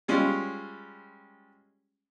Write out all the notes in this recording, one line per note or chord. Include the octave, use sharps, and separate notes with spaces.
G3 G#3 C#4 F4